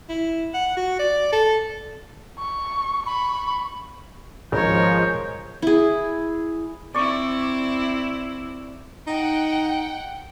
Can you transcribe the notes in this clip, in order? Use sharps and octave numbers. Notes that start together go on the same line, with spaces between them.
E4
F#5
F#4
D5
A4
C#6
B5 C#6
G#1 C#2 C#3 F3 G#3 A#4 C#5 G6
E4 G#4
C4 E4 D5 C#6
D#4 F#5 G5